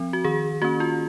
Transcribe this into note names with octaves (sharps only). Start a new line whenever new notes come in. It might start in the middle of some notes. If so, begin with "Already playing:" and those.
Already playing: F3 C4
F#4
D#3 G#4
A#3 C#4 F#4
F4